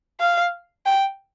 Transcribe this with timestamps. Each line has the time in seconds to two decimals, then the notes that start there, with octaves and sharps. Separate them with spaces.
0.20 F5
0.86 G5